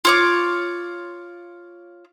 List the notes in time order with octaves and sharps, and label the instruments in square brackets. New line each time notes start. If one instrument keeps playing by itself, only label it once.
[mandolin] F4 C#5 D6